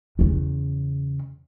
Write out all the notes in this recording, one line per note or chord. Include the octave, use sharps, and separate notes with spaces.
E2 C#3